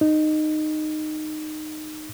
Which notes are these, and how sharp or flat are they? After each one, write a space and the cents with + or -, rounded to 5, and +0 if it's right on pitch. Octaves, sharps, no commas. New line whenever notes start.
D#4 -15